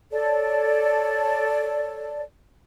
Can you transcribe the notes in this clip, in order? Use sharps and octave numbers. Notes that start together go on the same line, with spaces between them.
A4 C#5 D5